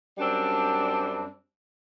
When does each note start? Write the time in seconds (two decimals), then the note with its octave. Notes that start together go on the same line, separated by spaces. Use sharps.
0.18 F#2 G3 C4 D4